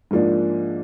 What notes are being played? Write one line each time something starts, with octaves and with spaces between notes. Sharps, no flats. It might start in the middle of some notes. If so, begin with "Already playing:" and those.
G#2 F3 A#3 D4